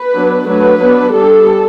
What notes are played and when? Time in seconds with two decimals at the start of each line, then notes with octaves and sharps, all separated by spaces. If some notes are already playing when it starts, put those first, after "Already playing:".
Already playing: B4
0.16 F#3 B3 D4
0.50 F#3 A3 D4 B4
0.82 F#3 B3 D4
1.15 G3 D4 A4